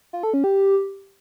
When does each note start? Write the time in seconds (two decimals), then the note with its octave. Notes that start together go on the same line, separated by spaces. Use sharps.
0.13 F4
0.23 A4
0.34 C#4
0.44 G4